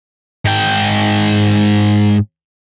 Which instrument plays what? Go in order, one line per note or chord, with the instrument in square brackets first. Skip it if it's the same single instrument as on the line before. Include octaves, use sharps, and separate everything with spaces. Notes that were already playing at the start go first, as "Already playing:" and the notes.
[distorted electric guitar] G#2 G5